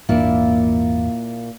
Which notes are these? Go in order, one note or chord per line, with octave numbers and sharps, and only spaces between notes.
G#1 E2 A#2 A#3 D4 E4